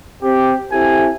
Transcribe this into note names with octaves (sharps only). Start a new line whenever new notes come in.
C4 G4
C4 E4 G4 A4 E5 G#5